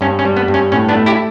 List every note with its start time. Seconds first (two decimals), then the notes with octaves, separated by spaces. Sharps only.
0.01 G2 C#4
0.19 C#4
0.25 G3
0.37 B3
0.48 G2
0.54 C#4
0.72 A2 C#4
0.89 B3 D4
0.95 A3
1.06 E4 G4